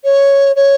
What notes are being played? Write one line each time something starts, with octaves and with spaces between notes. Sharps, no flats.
C#5
C#5